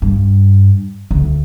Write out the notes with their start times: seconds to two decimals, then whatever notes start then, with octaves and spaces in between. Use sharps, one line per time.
0.02 G2
1.11 D2